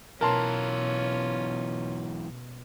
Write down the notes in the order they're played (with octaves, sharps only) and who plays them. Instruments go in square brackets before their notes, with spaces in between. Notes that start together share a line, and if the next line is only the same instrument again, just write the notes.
[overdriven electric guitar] B1 E3 [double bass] B2 [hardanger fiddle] C#4 F4 [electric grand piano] A#4 A5 C6